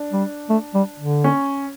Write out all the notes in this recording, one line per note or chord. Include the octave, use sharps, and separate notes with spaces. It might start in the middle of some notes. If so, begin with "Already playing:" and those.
Already playing: D4
G3
A3
G3
D3
C#4